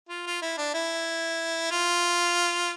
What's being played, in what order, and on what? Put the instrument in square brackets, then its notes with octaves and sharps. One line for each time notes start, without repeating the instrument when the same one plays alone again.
[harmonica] F4
F4
E4
D4
E4
F4